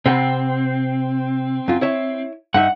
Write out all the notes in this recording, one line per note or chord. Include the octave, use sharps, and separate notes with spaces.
C3 C4 F#5 B5
F#2 F4
E4 C#5 E5
G2 D#4 E5 F#5